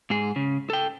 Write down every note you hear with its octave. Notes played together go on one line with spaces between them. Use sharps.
G#2 G#4
C#3
A4 G5